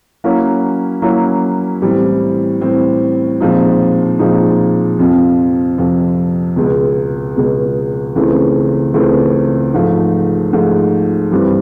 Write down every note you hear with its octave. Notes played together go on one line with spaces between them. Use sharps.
F#3 A#3 C#4 E4
F#3 A#3 C#4 E4
A2 E3 G3 C4
A2 E3 G3 C4
A#2 F3 G#3 C4 D#4
A#2 F3 G#3 C4 D#4
F2 C3 F3
F2 C3 F3
C#2 B2 G#3
C#2 B2 G#3
C#2 C#3 E3 A3 C4
C#2 C#3 E3 A3 C4
G#2 F3 A3
G#2 F3 A3
G2 E3 G3 C4